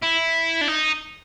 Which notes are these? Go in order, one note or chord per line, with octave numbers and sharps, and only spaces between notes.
E4
D4
D#4